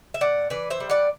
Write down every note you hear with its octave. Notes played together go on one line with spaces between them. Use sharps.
E5
A2 D5 F#5
E3 B4 D5
C5 E5
G3
D5 F#5